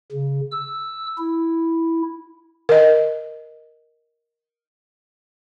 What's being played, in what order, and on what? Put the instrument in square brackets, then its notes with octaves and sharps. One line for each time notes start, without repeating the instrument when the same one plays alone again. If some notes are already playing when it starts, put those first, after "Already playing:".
[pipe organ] C#3
E6
E4
[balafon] A#4 D#5